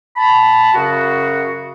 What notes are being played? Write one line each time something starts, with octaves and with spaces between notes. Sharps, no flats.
A5 B5
F#2 C#3 F#4